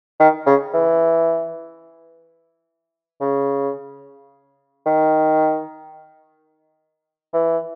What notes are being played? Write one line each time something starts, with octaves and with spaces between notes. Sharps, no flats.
D#3
C#3
E3
C#3
D#3
E3